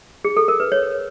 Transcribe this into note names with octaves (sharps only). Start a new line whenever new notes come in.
G#4
A4
A#4
B4
C#5